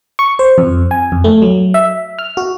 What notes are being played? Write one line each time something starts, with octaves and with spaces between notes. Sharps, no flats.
C#6
C5
F2
G#5
F2
A3
F#3
E5
F6
F#4